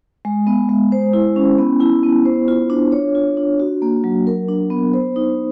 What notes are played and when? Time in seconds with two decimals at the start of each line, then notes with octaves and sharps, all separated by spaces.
0.25 G#3
0.47 B3
0.69 G#3
0.92 C5
1.13 E4
1.36 C#4
1.59 B3
1.81 E4
2.03 B3
2.25 C5
2.48 F4
2.70 D4
2.92 C#5
3.15 F4
3.37 D4
3.60 F#4
3.82 A#3
4.04 F#3
4.27 A#4
4.49 D4
4.70 B3
4.93 C5
5.16 D#4